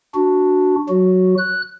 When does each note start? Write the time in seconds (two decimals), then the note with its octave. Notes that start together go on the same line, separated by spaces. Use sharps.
0.15 D4 F#4
0.89 F#3 F#4
1.38 F#6